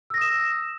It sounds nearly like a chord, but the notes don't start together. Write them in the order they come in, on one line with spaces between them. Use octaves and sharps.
E6 A#6 D#6 E7